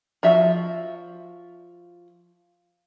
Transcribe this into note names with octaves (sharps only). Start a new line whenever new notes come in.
F3 F#4 E5